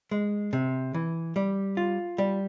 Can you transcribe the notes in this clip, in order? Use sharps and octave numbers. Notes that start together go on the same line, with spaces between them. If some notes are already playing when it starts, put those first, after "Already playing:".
G#3
C3
E3
G3
F4
G3